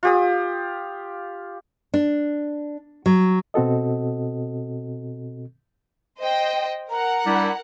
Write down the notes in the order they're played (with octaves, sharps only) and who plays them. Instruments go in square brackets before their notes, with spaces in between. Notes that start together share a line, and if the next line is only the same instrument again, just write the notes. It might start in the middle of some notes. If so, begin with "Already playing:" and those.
[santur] F4 G4 D#6
[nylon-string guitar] D4
F#3
[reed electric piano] B2 C4 F#4 A4 D#5
[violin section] C5 D#5 G5
[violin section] A#4 F#5 [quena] A#5
[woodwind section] G3 D4 E4